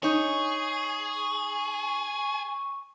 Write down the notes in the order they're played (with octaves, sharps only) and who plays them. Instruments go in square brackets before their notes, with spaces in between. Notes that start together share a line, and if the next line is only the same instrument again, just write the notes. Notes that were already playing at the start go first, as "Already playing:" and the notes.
[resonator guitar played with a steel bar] D#4 C#5 [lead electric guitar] G#4 [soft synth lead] C#6